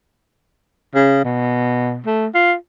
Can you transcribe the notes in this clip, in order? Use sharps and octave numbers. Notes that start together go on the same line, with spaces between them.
C#3
B2
A3
F4